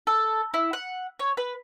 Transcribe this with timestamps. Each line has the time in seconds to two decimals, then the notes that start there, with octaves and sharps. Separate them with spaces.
0.07 A4
0.54 E4
0.73 F#5
1.19 C#5
1.37 B4